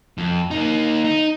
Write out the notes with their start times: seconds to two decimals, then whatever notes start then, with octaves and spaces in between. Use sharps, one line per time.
0.18 F2
0.51 A#3 D#4
1.04 D#4